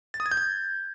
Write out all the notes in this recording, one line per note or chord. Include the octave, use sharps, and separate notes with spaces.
A6
D#6
G#6
G6
G#6